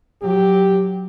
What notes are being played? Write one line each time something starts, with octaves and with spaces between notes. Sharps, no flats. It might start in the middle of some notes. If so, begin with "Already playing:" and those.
F#3 G4